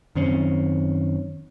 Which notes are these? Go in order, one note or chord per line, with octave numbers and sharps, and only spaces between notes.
F#2 D#3 C4 C#4